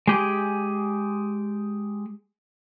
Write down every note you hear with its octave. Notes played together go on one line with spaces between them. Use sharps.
G#3 G4 G#4